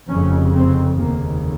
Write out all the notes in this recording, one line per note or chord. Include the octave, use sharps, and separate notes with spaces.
F1 F2 C#3 C#4
C4
F1 D#2 C#3 A#3